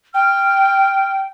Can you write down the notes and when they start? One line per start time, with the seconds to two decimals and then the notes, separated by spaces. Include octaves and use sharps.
0.14 G5 F6